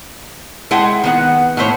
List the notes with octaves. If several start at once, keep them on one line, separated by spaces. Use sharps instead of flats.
G#3 E4 C5 F#5 G5
D#3 B3 F#5
A2 B3 E4 C5 C#5